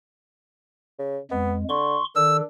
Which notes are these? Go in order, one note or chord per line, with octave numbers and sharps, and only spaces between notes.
C#3
F2 G#3 B3
D3 C6 C#6
D#3 D4 A4 E6